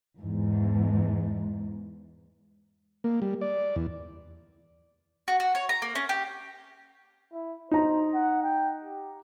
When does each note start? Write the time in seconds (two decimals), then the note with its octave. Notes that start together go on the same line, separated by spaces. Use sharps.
0.18 E2 G#2
3.04 A#3
3.22 G3
3.41 D5
3.76 E2
5.28 F#4
5.40 F#4
5.55 C#5
5.69 A#5
5.82 A#3
5.95 C#4
6.09 G4
7.33 E4
7.71 D#4 C5 A#5
8.14 F#5
8.43 G5
8.84 G4